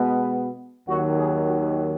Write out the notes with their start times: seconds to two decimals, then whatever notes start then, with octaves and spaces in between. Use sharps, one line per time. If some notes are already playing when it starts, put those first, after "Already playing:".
Already playing: B2 G#3 B3
0.87 D#2 D#3 F#3 F#4
1.18 G#4
1.47 F#4